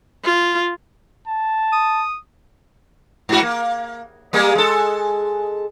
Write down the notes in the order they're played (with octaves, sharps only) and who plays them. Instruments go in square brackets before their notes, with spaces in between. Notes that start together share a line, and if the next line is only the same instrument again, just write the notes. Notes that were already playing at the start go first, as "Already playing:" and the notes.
[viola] F4
[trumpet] A5
[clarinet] D#6
[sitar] G#2 F#4
A#3
G3 G#3 A#3
G#3 A4